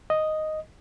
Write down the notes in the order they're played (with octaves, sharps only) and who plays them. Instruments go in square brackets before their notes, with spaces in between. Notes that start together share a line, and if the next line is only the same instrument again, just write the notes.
[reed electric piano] D#5